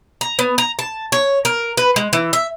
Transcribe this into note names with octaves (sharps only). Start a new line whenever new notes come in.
A#5
B3
A#5
A5
C#5
A#4
B4
G#3
E3
E5